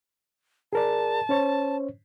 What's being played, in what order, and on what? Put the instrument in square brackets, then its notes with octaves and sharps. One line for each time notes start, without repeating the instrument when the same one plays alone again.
[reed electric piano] G#4 A#4 D5 [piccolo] A5
[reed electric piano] C#4 C5 C#5